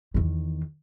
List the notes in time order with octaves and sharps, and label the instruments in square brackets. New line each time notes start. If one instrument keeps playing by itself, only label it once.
[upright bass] E2 D#3